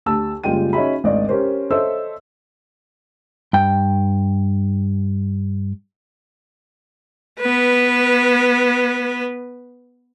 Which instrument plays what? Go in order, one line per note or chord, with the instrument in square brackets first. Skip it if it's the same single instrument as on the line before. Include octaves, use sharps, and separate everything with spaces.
[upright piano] D2 G4 A5 E6
F#1 G3 G#3 F4 G5 D#7
C#4 D#4 F#4 G#4 E5 B5
G#1 D2 D5 D#5
C#4 G4 A#4 C5
A4 C5 C#5 D#5 E5 E6
[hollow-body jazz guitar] G2 G5
[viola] B3 B4